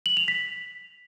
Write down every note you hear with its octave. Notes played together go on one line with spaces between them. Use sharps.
F#7
F7
B6